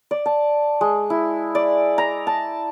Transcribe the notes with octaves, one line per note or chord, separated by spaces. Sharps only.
D5
A5
G#3
E4
D5
A#5
A5